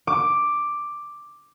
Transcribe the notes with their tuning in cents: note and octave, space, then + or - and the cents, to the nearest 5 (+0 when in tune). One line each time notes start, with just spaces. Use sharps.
D6 +5